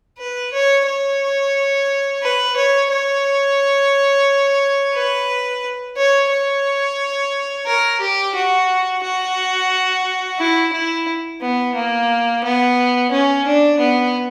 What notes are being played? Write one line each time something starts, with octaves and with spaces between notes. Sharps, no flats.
B4
C#5
C#5
B4
C#5
C#5
B4
C#5
C#5
A#4
G4
F#4
F#4
E4
E4
B3
A#3
B3
C#4
D4
B3